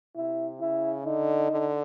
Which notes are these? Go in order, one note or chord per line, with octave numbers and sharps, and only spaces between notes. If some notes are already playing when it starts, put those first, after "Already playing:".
C3 E4
C#3 E4
D3 D#4
D3